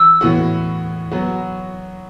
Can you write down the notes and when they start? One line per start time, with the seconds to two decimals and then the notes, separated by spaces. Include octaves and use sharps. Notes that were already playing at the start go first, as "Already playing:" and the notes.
Already playing: E3 E6
0.21 A2 E3 B3 F#4
1.11 F#3 B3 F#4